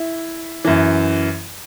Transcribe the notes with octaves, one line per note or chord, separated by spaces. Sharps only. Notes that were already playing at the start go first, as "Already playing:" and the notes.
Already playing: E4
F#2 E3